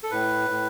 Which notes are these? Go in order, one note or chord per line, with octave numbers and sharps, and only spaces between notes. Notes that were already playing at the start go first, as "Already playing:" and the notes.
A4
A2 B4
A2